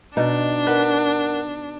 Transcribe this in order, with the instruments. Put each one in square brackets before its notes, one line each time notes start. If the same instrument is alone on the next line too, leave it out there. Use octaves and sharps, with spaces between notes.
[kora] B2 D#4 [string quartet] D4
[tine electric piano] A#4 F#5 F#6 [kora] B4